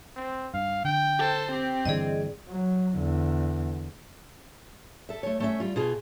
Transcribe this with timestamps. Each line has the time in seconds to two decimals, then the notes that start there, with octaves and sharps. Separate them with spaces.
0.16 C4
0.54 G2 F5
0.85 D3 G5
1.19 A4 C5
1.52 C4 G4
1.85 G2 D3 E3 G#4 D5 D#5
2.49 F#3
2.96 E2 D3
5.09 A4 E5
5.23 A3 C#5
5.40 A3 C#4 E5
5.60 G3 F4
5.76 B2 F4 G#4